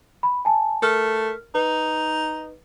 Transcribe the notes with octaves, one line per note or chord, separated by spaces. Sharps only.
B5
G#5 A5
A3 A#4 F6
D#4 B4